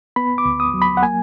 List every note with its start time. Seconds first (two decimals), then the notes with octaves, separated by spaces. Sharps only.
0.16 B3 B5
0.38 D6
0.45 D2
0.60 D#6
0.74 F#3
0.82 B5
0.97 F#5
1.02 A#3 G#5